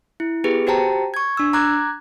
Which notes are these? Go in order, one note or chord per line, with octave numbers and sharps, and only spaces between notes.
E4
B3 G4 G#4 B4
F#4 G4 C5 G5 A5 A#5
C#6 G#6
D4 E6
A#5 D6 F#6 G#6